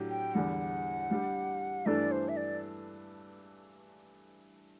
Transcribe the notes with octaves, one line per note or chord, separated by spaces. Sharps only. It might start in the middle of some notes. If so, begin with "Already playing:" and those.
Already playing: A2 F#3 D4 G4
G5
E2 D3 G3 F#5
G3 D4 G4
G2 E3 A3 D4 A4 D5
C5
E5
D5